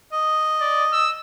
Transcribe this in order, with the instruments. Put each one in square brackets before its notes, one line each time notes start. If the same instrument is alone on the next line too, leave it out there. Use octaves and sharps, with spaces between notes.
[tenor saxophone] D#5
[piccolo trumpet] D5
E6